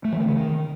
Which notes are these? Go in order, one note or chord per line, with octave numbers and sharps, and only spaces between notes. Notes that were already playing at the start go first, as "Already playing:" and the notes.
A3
E3
D#3
C#3
D#3